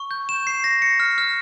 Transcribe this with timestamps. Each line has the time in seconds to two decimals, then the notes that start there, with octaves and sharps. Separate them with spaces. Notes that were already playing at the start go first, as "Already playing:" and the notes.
Already playing: C#6
0.11 G6
0.29 E7
0.47 C7
0.64 A#6
0.82 C#7
1.00 F6
1.18 F6